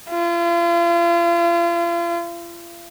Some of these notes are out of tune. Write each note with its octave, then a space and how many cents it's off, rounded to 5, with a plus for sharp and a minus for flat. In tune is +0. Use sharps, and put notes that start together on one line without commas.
F4 -40